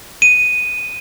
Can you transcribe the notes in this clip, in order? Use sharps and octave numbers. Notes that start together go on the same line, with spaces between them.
D#7